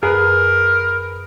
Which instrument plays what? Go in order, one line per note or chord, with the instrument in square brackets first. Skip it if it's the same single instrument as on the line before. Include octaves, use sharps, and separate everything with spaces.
[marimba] F#2 [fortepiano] G#4 B4 [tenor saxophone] A#4